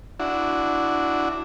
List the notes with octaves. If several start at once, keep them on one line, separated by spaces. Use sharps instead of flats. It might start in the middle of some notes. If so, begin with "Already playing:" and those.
D4 E4 F#4